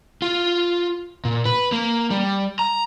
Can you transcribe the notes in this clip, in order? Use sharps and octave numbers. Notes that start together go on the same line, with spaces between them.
F4
A#2
B4
A#3
G3
A#5